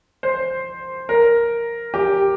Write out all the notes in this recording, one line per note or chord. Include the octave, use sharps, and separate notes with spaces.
C5
A#4
G4